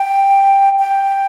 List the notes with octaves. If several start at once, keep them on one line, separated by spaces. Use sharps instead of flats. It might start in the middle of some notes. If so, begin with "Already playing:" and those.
Already playing: G5
G5